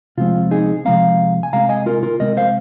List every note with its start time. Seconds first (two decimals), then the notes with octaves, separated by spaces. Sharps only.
0.17 C3 F3 G#3 C4 F4
0.51 D#4 G#4
0.85 C3 F3 G#3 C4 F5 A#5
1.43 G#5
1.53 C3 G#3 C4 F5 A#5
1.69 D#5 G#5
1.86 F4 A#4
2.03 F4 A#4
2.20 C3 G#3 C4 A#4 D#5
2.37 C5 F5